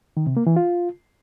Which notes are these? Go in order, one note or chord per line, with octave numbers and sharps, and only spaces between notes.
D#3
C3
A#3
E3
F4